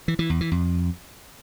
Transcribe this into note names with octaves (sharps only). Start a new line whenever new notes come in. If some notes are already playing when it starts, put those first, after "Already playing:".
E3
E3
E2
E3
F2